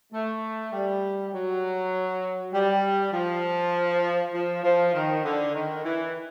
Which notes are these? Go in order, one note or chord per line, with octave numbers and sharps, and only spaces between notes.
A3
G3
F#3
G3
F3
F3
F3
D#3
D3
D#3
E3